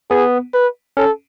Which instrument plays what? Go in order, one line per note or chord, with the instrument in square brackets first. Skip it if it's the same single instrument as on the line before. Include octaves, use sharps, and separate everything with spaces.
[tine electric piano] B3 [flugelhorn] G#4
[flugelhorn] B4
[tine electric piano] C#4 [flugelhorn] A4